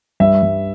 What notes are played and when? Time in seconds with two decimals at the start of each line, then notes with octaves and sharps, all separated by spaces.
0.20 G2 E5
0.43 G2